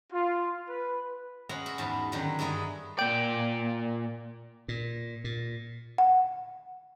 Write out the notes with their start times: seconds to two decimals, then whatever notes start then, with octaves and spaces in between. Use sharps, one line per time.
0.13 F4
0.69 B4
1.49 G#3 C#4 F#5 A#5 B5
1.66 F#4 E5
1.78 E2 G#2 B4 A5
2.12 F#2 D3 D#3 F#3
2.39 G2 G#3 E4 B4 D#5 A#5
2.99 A#2 D5 G5 D7
4.68 A#2
5.24 A#2
5.98 F#5